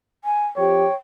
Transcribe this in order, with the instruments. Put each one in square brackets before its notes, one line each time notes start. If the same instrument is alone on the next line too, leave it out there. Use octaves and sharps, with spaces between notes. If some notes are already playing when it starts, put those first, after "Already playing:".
[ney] G#5
[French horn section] F2 F3 G4 [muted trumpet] C#5 [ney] G5